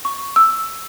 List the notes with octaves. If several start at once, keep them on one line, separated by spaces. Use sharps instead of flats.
C#6
E6